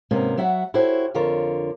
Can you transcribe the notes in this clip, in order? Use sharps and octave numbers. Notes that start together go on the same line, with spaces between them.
G#2 C3 A#3 B3 C#4
F#3 F#4 E5 F#5
E4 F#4 G4 A4 C5 C#5
F2 D3 F4 A#4 C#5